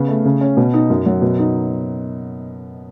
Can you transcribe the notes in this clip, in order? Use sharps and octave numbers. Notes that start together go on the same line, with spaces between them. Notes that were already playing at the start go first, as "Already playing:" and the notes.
Already playing: C#3 B3
A3
C#3
C#4
B2
D#4
F#2
F#3
B2
D#4